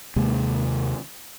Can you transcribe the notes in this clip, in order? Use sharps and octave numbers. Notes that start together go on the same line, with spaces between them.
D#2 C3 G#3 A#3